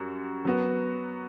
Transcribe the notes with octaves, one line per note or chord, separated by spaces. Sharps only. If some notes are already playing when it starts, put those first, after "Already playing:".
Already playing: F#2 G3 F#4
F#3 B3 F#4